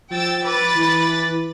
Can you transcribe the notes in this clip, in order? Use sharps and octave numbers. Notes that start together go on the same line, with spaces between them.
F3 G5 E6 A6
B4 D6 A6
E3